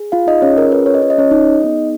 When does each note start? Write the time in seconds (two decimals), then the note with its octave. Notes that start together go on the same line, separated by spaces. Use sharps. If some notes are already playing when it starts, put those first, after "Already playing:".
Already playing: G#4
0.12 F4 F5
0.27 D#4 D#5
0.42 C#4 F4 G#4 C#5
0.58 A#4
0.72 B4
0.86 C#5
0.95 D#5
1.02 C#4 F4 G#4 C#5
1.10 D#5
1.18 C#4 C#5
1.31 D#4 D#5
1.61 B3 D#4 G#4